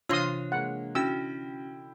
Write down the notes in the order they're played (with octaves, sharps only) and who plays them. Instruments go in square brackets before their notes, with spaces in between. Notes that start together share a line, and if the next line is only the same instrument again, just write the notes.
[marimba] C3 E3 A#6 [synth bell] D4 C#5 [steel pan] F4 C6 D#6
[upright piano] G#3 A#3 [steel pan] F#5
[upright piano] D3 E4 G5 [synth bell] C#4 F#4 [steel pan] E6